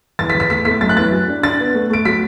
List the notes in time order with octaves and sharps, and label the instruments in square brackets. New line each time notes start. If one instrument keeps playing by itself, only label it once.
[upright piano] E2 A6
B6
E2
B6
A3 B6
A3 B6
F#2 A6
F#6
E3 A6
F#3
D4
D4 A6
B3
A3
A3 D7
F#3 B6